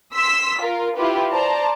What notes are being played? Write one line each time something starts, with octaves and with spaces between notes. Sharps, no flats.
C6 E6 B6
F4 A#4
E4 F4 G4 B4
C5 D5 A5 A#5